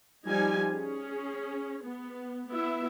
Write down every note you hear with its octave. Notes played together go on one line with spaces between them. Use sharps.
F3 G3 D#4 G#5
C#4 G#4
B3
B3 E4 E5